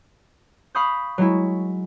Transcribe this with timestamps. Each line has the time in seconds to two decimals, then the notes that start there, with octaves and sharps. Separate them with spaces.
0.75 F5 B5 C#6 D#6 G6
1.18 F#3 G#3 E4